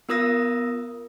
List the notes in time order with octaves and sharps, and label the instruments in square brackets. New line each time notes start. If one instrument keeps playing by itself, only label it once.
[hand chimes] B3 F4 A#4 D#6 E6 A#6